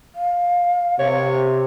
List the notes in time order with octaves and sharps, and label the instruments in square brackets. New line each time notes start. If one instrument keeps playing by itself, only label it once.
[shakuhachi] F5
[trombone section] C3 [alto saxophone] C#5